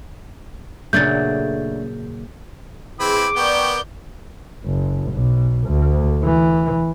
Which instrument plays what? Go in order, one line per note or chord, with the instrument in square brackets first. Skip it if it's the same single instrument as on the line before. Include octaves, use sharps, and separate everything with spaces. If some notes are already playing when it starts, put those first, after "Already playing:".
[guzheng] A#2 C#3 F#3 [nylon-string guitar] A3 D4 [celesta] G6 A6
[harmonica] E3 C4 B5 [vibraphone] G#4 [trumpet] D6
[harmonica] B3 [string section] A#4 D5 G6 [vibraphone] G5 C#6
[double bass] F#1
B1
D2
E3